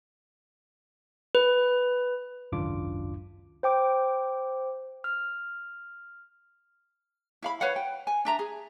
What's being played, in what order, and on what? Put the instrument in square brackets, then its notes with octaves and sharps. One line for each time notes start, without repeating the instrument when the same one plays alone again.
[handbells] B4
[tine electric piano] G#1 C#2 F#2 D4 F4 D6
[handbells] C5 G5 D6
F6
[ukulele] E4 F5 B5
B4 C#5 F5 F#5
G5
G#5
D4 E5 A#5
G#4